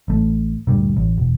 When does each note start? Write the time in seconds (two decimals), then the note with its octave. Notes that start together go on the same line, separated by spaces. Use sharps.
0.08 A1 A3
0.67 D2 G2 A#2
0.97 A1
1.18 E1